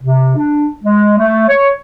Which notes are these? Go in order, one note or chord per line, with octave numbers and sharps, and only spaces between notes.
C3
D4
G#3
A3
C#5